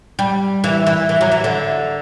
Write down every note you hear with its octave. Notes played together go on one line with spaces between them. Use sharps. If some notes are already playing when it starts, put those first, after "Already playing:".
G3
E3
E3
E3
F#3
E3
D3